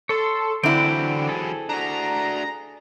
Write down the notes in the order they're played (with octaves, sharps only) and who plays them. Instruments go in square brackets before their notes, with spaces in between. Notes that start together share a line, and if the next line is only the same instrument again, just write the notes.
[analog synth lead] A4 [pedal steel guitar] C#5 C6
[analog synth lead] D3 [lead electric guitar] E3 F#3 [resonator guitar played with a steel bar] C4 E4 [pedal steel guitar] G5
[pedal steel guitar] G#4 A4
[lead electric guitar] D4 F#4 [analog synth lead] A#5